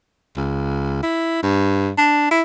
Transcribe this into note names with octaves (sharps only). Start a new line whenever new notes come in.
C#2
E4
G2
D4
E4